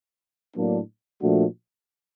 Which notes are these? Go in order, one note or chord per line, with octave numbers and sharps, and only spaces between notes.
A2 F#3 A#3 D4
A#2 F3 A3 D4 F#4